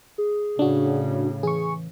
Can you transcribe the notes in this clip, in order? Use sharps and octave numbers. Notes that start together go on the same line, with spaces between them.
G#4
A2 C#3 D4 F#4
E3 G#4 C#6